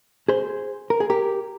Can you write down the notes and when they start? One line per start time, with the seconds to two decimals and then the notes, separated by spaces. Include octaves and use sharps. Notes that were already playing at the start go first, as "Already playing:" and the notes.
0.28 G#4 C5
0.90 A#4
1.00 G#4
1.10 G4 A#4